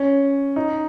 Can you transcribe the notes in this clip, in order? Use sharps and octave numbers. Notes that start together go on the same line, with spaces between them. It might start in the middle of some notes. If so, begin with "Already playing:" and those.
Already playing: C#4
D#4